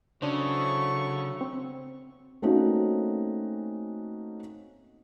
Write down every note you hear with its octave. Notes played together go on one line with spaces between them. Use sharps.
C#3 F#3 D4 E4 A4 C5 C#6
C4
A3 A#3 C4 C#4 D#4 F#4